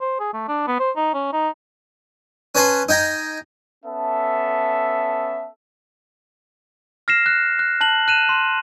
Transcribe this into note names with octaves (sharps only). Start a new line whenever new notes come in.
C5
G#4
A3
D4
B3
C5
D#4
C#4
D#4
C#4 B4 C#5 A5 B5 C6
D#4 G5 G#5 A#5
B3 C#4 A4 E5 A5
F6 A#6 C7 E7
F#6
F#6
A5 F#6 F#7
F#6 D#7 E7
C6